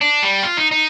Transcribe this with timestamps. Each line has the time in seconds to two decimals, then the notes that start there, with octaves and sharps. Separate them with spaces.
0.01 D4
0.23 G3
0.43 F4
0.57 D#4
0.71 D#4